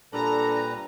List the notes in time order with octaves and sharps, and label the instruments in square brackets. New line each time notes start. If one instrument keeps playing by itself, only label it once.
[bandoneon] A#2 G3 B4 [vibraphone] D4 [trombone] A4 [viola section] A#5